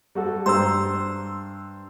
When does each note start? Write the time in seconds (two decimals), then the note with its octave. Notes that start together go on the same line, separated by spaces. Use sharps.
0.15 G3 F#4 A4
0.46 G2 C5 A#5 C6 E6